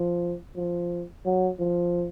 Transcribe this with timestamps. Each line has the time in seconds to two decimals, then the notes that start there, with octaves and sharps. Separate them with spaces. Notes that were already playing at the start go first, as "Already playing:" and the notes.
Already playing: F3
0.56 F3
1.25 F#3
1.60 F3